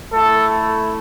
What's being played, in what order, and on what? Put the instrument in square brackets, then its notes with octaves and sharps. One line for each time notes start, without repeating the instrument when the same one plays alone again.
[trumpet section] A3 E4 A4